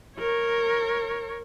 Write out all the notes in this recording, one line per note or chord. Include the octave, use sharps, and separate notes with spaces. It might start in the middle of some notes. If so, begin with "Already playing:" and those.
A#4 C#5